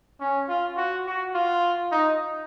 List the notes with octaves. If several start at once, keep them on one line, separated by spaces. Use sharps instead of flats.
C#4
F4
F#4
F#4
F4
D#4